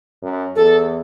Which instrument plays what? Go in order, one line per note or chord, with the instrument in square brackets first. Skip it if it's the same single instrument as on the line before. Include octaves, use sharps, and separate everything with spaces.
[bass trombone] F#2
[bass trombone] E2 [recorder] A4